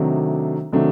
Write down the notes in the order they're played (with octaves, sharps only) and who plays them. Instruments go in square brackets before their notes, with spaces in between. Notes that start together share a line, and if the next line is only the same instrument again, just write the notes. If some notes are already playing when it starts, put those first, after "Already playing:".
Already playing: [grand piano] C3 D#3 F#3 A3 D4
C3 D#3 F#3 A3 D4